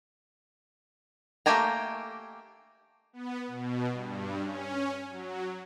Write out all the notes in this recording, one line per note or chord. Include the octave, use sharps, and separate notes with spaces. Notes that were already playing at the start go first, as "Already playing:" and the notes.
A3 A#3 G4 G#5 A#5
B3
B2
G2
C#4
F#3